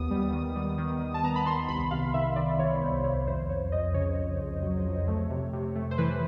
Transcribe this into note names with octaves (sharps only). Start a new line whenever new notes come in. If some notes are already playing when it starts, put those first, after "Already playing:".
Already playing: D#2 B3 D#6
G3
D#3
G3
D#3
D#3
A5
B3 A#5
B5
D#3 C6
C2 B5
C3 F5
D#3 E5
D#3 D5
D#3 C#5
C2 C5
C2 C#5
F2 C5
F2 C#5
F2 D#5
C#3 C#5
F2
F2
F#3
F2
A3
C3
C3
A3
C5
E3 B4